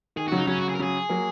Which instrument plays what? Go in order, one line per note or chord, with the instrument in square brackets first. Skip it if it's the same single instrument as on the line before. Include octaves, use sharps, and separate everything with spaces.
[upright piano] D#3 [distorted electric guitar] G#4
[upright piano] C#3 F#3 [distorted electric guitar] F#4
[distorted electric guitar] D#4
[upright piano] C#3 F#3 [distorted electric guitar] C#4
[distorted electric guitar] F#4
G#4
A#4
[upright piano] C#3 F#3 [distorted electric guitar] G#4
[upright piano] F#3 A#3